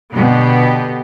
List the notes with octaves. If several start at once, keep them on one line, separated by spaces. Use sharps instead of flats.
B2 D3 B3 G4